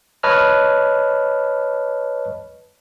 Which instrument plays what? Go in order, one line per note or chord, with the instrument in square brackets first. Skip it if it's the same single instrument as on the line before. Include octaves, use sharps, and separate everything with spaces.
[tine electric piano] B4 C#5 D#5 A5 F6